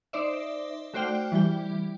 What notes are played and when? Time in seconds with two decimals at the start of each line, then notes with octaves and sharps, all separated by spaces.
0.13 D#4 C5 D5 E5
0.94 A3 F#4 C5 D5 G5 F6
1.32 E3 G3 G5